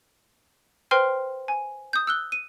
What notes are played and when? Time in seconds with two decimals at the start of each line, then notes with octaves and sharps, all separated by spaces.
0.91 B4 C5 G5 C6 F6 C7
1.48 G#5
1.93 D#6 G6
2.07 E6 F#6 G7
2.32 D#7